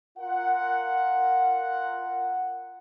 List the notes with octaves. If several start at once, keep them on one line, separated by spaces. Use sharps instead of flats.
F4 A#4 F#5